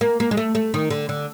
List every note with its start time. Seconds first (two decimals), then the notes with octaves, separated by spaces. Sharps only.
0.01 A#3
0.20 A#3
0.31 G#3
0.37 A3
0.55 A3
0.74 D#3
0.91 D3
1.09 D3